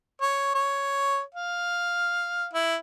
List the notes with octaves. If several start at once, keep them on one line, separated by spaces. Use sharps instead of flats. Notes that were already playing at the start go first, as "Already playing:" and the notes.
C#5
C#5
F5
E4